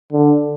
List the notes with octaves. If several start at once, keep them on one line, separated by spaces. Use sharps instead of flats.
D3